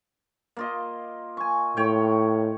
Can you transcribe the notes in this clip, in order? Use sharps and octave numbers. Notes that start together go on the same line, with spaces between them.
A#3 F4 D#5
G#5 C#6
A2 C#5 G5